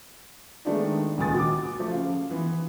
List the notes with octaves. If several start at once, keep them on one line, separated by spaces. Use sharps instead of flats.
D#3 G#3 A3 B3 D4 D#4
D#1 C#2 D#3 G#5 D#6 A6
F#4 D6
F3 A3
C#3 F4
E3 B3